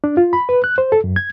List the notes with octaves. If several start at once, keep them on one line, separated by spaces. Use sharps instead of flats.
D4
F4
B5
B4
F#6
C5
A4
F#2
G#6